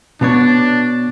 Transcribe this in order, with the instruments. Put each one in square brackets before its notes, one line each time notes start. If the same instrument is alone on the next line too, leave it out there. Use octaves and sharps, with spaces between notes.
[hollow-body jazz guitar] B2 B3 C#5 [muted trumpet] D4